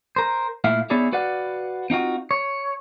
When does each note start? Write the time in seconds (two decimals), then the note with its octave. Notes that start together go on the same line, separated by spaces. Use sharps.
0.16 A#4 C5
0.64 A#2 A3 E4 E5 F5
0.90 B3 D#4 E4 G#4 C#5 D5
1.12 F#4 B4 D5 F5 F#5
1.90 C4 D#4 F4 F#4
2.31 C#5